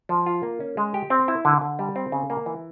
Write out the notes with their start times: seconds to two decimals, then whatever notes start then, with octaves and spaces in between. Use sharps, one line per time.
0.09 F3
0.26 F4
0.43 A#3
0.60 C#4
0.77 G#3
0.94 G4
1.10 C4
1.28 E4
1.45 D3
1.61 D3
1.79 G3
1.96 C4
2.12 C#3
2.30 A#3
2.46 E3